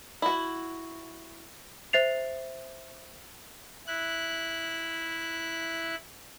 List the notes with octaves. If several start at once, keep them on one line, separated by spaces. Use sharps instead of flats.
E4 F#4
C5 E5 A6 C7 F7
E4 F#6